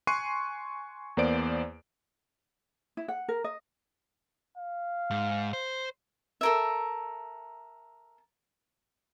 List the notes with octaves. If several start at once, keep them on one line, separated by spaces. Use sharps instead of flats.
G#5 C6 C#6 F#6 C7 D#7
E2 A#3 B3 C5 D5 D7
E4
F#5
A#4
D#5
F5
G#2
C5
A4 A#4 E5